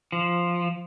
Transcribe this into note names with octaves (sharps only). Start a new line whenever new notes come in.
F3